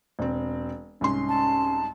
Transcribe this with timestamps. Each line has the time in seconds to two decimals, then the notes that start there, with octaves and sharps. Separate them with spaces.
0.19 E1 C4
1.01 C2 G#2 C#4 C6
1.29 A5